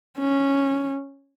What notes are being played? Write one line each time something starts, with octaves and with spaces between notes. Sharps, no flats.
C#4